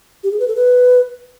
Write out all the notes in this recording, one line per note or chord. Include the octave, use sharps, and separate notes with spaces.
G4
G#4
B4
A4
B4